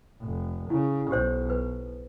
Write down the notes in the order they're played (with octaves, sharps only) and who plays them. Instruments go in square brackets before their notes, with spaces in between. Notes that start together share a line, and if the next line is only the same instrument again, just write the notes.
[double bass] F1
[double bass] C#3 [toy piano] E4
[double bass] B1 [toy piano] G4 C5 C#5
[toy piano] B4